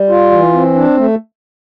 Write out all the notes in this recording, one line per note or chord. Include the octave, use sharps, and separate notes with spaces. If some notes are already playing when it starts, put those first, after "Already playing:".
Already playing: G3
F4
E3
C4
D4
A3